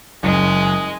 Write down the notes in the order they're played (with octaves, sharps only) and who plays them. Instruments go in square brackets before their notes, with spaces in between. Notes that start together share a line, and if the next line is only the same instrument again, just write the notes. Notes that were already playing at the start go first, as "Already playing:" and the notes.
[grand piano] F#1 [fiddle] G#3